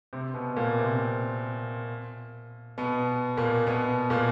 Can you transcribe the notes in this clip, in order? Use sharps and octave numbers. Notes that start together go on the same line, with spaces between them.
C3 C4
B2 B3
A#2 A#3
C3 C4
B2 B3
A#2 A#3
B2 B3
A#2 A#3